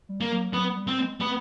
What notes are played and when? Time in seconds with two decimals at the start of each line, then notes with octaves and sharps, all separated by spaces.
0.09 G3
0.21 A#3
0.31 F#3
0.53 F#3 B3
0.76 G3
0.87 C4
0.99 G#3
1.20 A3 B3